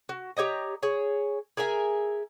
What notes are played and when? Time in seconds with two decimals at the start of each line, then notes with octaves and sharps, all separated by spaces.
0.09 F#4
0.37 G4 C#5 D#5 A#5
0.83 G#4 C#5
1.57 G#4 A#4 E5 G#5